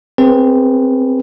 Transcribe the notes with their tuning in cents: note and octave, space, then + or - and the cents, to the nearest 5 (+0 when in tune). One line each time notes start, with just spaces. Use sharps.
C4 +0 G#4 +0 B4 -25